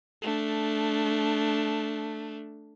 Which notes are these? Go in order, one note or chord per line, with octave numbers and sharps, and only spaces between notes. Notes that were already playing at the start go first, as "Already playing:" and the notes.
A3 D4